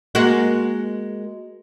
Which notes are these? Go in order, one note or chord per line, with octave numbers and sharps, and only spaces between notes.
G#3 A#3 F#4